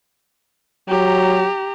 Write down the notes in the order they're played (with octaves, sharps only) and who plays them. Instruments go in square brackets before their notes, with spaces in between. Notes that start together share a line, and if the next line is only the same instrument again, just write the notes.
[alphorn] F#3 [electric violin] G4 A#5